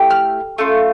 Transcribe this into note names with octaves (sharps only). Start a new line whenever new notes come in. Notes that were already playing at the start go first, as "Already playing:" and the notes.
Already playing: A3 E4 G4
F6
A3 C#4 F4